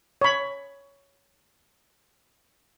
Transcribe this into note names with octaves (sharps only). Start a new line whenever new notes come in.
C#5 B5